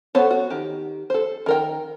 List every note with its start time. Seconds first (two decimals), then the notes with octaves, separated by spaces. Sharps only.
0.15 B3 F#4 A4 C5 C#5
0.31 F#4
0.50 D#3 G4
1.10 A4 C5
1.46 D#3 A#4 G5